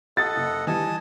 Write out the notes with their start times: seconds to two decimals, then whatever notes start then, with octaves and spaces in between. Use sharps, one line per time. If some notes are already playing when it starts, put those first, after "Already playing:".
0.17 A4 D#5 F#5 D#6 A6
0.36 F#1
0.67 E3 G3 D#5 G#5 A5